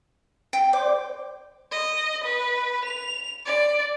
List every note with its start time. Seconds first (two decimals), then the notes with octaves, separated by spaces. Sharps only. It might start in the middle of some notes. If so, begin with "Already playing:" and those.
0.53 G5
0.73 C5 D5 G5 D6
1.71 D#5
2.24 B4
2.85 F7
3.45 D5